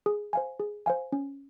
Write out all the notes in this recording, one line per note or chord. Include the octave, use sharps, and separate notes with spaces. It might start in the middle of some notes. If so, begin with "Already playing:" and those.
G#4
C5 F5 G#5
G#4
C5 F5 G#5
C#4